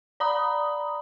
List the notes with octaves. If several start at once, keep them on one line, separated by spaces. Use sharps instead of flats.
D5 A#5 B5 D#6